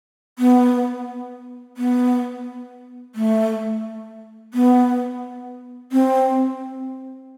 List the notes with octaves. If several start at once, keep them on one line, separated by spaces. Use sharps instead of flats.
B3
B3
A3
B3
C4